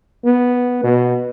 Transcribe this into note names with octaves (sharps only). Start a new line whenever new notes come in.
B3
B2